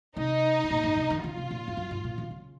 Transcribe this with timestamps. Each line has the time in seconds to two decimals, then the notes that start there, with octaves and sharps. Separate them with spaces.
0.17 C3 D#4
0.64 C3
0.71 A#2
0.84 G#2
0.97 C3
1.10 D#3
1.24 C#3 F4
1.37 C3
1.51 A#2
1.68 F2
1.77 F#2
1.91 G#2
2.04 A#2
2.18 D#3
2.31 C#3